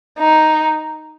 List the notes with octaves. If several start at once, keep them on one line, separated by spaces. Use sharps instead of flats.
D#4